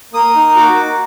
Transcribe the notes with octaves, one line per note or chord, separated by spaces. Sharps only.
A#3 D#6
D#4
F#4 D6
A#3